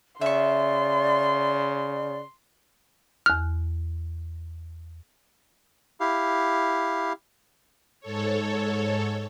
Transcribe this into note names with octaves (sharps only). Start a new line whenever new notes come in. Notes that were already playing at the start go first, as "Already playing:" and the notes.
C#3 D5 E5 C6 C#6
E2 F6 F#6
E4 G4 F5
G#2 A4 C#5